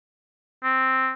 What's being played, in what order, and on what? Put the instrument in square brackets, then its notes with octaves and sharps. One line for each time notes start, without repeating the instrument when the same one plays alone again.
[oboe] C4